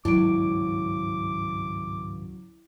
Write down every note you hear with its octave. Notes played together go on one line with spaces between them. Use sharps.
G#1 C#2 G2 F#3 E4 D6 D7